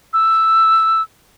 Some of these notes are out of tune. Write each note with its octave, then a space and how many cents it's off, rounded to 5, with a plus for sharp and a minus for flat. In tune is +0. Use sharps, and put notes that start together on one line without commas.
E6 +0